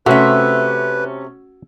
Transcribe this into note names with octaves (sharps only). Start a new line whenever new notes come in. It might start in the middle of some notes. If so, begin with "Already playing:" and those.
C3 A3 C#4 F#4 B4 E5